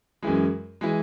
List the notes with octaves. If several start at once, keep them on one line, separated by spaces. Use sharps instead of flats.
F#2 E3 G#3
E3 G#3